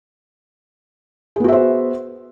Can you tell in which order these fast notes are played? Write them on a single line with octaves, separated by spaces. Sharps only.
G#4 B3 F#4 E5 C5